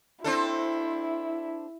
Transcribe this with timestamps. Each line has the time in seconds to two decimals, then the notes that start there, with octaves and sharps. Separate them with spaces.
0.24 C4 D4 E4 A4